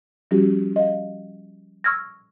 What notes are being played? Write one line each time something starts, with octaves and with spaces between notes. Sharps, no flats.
F3 G3 C#4 F#4 G4
D#5 F5
C#6 E6 F6 G#6 A#6